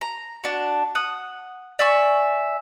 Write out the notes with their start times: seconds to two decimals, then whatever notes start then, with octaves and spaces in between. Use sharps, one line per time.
0.01 A#5
0.44 D4 F#4
0.95 F#5 D#6
1.79 D5 E5 G#5 C#6